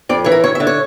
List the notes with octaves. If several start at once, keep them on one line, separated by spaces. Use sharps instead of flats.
F2 D5
E3 C#5
A#4
D2 C#5
E5
D3
C#5